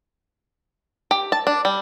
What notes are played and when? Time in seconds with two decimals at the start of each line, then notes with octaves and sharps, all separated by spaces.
1.11 G4
1.32 A5
1.47 D4
1.65 G3